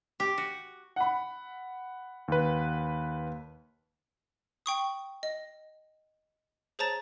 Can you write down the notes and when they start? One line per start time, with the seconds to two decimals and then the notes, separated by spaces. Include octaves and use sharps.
0.20 G4
0.38 F#4
0.96 F#5 B5
2.28 D#2 B4
4.66 G5 C#6 D#6
5.23 D#5
6.79 G#4 C5 C#5 A5 A#5 A6